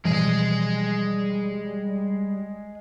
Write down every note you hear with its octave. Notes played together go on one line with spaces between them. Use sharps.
B2 E3 F3 G3 G#3 G#4